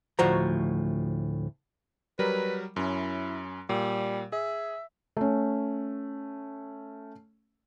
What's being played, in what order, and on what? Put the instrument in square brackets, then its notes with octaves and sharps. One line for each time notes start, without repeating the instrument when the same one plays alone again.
[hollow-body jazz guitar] D2 A2 F3 F#4 C5 A#5
[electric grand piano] F#3 G3 A#4 [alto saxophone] B4
[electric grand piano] F#2 C#4 [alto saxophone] E4
[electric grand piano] A#2 [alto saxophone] G3
[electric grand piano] G#4 [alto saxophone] E5
[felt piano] A3 C#4